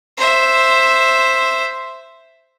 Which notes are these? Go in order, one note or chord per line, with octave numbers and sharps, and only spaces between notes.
C5 E5